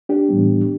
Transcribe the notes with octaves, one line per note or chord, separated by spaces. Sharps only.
D4 G4
A2 E3 G3 B3